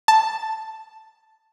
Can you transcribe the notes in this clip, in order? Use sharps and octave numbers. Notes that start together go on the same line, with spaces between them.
A5